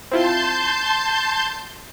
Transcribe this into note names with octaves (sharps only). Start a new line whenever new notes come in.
C4 E4 F4 A5 C6 G6